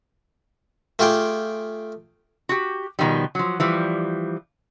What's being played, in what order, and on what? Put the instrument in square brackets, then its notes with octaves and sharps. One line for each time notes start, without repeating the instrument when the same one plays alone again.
[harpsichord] A3 F4 G4 G#4 G5
[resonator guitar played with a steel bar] F#4 G4
B2 D#3 F3 G3
F3 F#3
E3 F3 G3